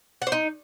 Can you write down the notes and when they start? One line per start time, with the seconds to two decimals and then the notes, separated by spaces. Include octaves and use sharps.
0.22 F#5
0.27 C5
0.32 D#4